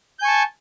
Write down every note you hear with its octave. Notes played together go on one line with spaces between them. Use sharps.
G#5 A5 C#6 G6